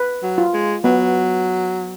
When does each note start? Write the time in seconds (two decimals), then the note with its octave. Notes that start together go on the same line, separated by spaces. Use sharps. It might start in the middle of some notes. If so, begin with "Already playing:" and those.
Already playing: B4
0.23 F#3
0.38 F4
0.54 G#3
0.84 F#3 B3